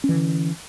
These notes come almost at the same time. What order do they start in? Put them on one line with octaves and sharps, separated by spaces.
C#4 E3 D3